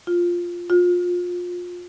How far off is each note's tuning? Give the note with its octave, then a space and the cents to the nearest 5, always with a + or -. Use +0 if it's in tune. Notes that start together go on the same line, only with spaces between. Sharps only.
F4 +0
F4 +25